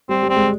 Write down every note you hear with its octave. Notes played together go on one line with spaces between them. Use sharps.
G3 C4
G3
C4
G#3